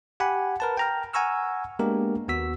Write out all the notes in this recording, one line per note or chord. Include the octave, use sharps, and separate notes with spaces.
G4 F#5 G#5 B5
A#4 B4 A5
G5 A#5 F6
F#5 G#5 A#5 C#6 E6 F6
G#3 A#3 B3 D4 G4 A#4
D#2 B3 F#4 E6 B6